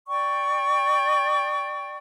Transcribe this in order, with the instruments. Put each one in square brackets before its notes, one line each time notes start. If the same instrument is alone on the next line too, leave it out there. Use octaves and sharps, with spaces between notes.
[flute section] D5 G5 C#6